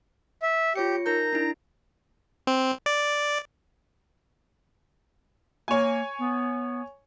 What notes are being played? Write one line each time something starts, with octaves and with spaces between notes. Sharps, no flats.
E5
F4 G4 C#5 C#7
D#4 A#4 A#5 G6
D4 E4
C4
D5
A#3 C#5 G#5
B3